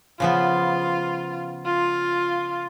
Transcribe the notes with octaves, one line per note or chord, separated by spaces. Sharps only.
C#3 F3 B3 F4
F4